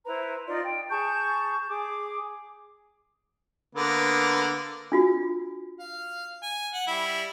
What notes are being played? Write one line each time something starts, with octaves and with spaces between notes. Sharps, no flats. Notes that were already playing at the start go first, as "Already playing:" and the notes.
E4 B4 C5 A#5
D#4 F4 D5 C6
G5
G#4 A5 C#6 G6
G#4 D6
D3 A#3 B3
D4 F4 F#4
F5
G#5
F#5
G3 E4